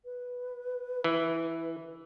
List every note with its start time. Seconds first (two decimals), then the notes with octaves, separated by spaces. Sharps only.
0.05 B4
1.04 E3